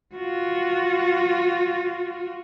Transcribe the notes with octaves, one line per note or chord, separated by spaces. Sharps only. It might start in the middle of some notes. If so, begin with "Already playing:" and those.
F4 F#4